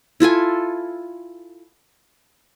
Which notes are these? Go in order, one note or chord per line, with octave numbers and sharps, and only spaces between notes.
E4 F4 A4 G#5